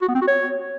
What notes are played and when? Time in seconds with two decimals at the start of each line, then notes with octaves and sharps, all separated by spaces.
0.02 F#4
0.09 B3
0.15 C4
0.21 F#4
0.28 C#5